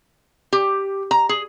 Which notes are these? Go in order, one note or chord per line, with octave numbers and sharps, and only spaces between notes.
G4
A#5
G#4